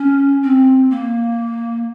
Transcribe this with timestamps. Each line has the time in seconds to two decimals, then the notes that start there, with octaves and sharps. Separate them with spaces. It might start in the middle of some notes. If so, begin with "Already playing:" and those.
Already playing: C#4
0.43 C4
0.91 A#3